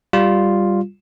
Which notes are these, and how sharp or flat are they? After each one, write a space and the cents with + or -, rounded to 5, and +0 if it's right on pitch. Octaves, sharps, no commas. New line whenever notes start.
G3 +0 F4 +0